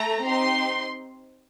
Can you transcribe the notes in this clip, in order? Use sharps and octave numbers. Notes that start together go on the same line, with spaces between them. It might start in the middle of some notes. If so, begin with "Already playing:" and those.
Already playing: A3 A4 A#5
C4 D#4 G4 C6